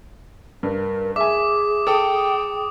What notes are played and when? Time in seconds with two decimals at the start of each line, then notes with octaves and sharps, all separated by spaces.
0.63 G2 A#4
1.16 G#4 E5 G#5 D6
1.87 A4 G5 D#6